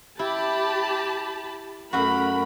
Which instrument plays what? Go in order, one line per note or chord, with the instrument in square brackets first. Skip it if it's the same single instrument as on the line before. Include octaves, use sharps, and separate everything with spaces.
[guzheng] E4 [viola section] G4 A5 B5
[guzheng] F#2 F#4 [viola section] A3 A#4 B5